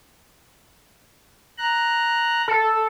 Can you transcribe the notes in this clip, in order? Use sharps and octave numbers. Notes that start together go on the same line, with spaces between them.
A#5 F#6
A4